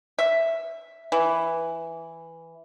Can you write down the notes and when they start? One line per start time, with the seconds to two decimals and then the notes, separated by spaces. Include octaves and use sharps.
0.19 E5
1.12 E3